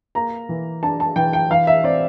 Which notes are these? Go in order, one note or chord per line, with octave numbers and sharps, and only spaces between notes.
A#3 A#5
E3
D4 A5
A5
E3 G5
G5
E3 F5
E5
C4 D5